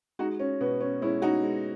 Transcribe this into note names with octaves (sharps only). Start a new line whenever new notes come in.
G#3 D#4 F#4
C#4
B2 B3
C#4
G#3 C#4 E4
D#4 F#4
G#3